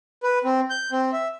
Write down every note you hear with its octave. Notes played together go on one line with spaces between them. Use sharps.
B4
C4
G6
C4
E5